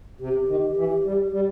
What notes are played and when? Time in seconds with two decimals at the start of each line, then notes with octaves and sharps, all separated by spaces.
0.20 C3 G4
0.48 D#3
0.76 E3
1.04 G3
1.32 G3